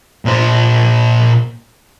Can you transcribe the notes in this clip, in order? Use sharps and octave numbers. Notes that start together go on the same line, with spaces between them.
A#2 C5